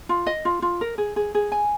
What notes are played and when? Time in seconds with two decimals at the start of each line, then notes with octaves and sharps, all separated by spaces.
0.09 F4
0.27 D#5
0.45 F4
0.62 F4
0.81 A#4
0.98 G#4
1.16 G#4
1.35 G#4
1.52 G#5